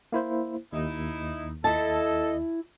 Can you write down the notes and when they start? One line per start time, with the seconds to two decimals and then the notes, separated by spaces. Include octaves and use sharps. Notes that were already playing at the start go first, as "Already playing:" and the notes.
0.12 A#3 E4 C5
0.73 D#2 D#4 E4
1.64 E4 A4 D#5 A5